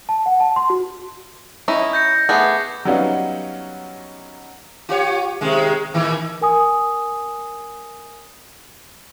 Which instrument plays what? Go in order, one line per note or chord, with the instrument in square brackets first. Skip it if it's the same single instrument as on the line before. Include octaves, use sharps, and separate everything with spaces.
[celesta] A5
F#5
A5
C6
F#4
[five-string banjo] C#4 D#4 E4
[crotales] G6 A#6 C#7
[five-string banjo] A3 B3 G#4 [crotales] D6 C7
[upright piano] F#3 G3 B3 C#4 D#4 F5
[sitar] F4 G4 C#5
C3 D#3 G#3
A2 D#3 E3
[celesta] A#4 G#5 D#6